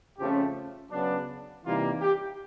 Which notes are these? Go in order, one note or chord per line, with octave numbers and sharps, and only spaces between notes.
F2 C#3 F3 A3 C#4 G4
C#3 F#3 B3 D4
C3 E3 G3 A#3 D#4 F4
G4